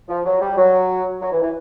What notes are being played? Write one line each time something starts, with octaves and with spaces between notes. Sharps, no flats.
F3
F#3
G3
F#3
F#3
E3
E3